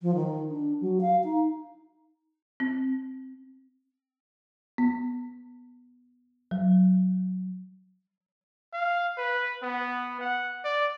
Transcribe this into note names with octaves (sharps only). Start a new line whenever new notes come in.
F3
D#3
D4
F#3
F5
D#4
C4
B3
F#3
F5
B4
B3
F#5
D5